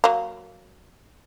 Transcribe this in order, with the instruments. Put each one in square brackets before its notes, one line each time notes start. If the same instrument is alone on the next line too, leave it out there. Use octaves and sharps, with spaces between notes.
[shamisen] F#3 A#3